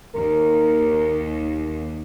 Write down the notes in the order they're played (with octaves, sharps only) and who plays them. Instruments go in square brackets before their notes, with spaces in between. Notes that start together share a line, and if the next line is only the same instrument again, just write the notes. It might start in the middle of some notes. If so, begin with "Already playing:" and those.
[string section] D#2 [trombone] A#4